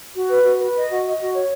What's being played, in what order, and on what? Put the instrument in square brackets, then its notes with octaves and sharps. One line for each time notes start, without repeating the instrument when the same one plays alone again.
[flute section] F#4
B4
F#4
B4
D#5
F#4
D#5
F#4
C#5